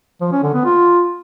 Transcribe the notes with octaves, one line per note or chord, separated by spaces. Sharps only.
F3
C#4
D3
B3
F4